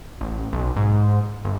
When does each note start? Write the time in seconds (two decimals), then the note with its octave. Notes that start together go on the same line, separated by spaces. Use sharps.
0.21 A1
0.53 B1
0.76 G#2
1.45 G1